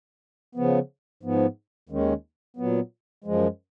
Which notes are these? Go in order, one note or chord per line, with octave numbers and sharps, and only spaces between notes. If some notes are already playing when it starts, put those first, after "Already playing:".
C#3 F3 B3
G#2 F3 B3
D#2 D#3 G#3 C#4
A#2 F#3 B3
F#2 F3 G#3